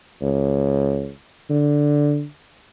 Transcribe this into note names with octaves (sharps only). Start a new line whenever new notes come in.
C#2
D3